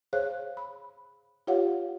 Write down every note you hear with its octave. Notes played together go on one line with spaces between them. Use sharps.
G#4 C5 C#5 F5 F#6
B5
F4 G4 C#5 F5 F#5